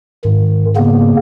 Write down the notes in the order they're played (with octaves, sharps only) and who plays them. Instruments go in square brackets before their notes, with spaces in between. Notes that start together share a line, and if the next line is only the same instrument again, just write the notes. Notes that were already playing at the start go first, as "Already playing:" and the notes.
[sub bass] G#2 [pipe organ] D#3
[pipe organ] C#3 A#3 B3